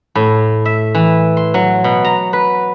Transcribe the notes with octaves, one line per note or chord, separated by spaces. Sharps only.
A2
E5
E3
C6
F#3
B2
A#5
B4